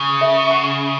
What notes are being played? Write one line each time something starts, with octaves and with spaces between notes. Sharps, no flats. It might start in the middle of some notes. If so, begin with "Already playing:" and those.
Already playing: C#3
E5
F#5